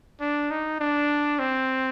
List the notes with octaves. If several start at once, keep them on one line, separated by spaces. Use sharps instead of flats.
D4
D#4
D4
C4